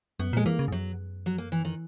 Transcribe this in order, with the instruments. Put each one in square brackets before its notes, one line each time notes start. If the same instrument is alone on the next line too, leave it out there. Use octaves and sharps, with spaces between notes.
[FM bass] F#2 [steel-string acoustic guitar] B3
[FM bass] A#2 [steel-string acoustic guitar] G#3
[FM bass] E3 [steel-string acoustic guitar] A#3
[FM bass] C#3
G#2
[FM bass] F#2 [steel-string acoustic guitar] F#3
[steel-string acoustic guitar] F#3
A#3
E3
D#3